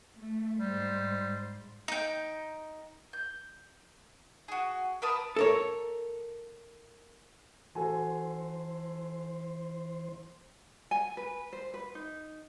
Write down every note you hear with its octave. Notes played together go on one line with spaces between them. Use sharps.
A3
G#2 G3 C5
D#4 G5
G6
F#4 G#4
A#4 B4 A5 D#6
A4 A#4 C#5
E3 F#4 A4 C5 G#5
G#5
B4
C5
B4
D#4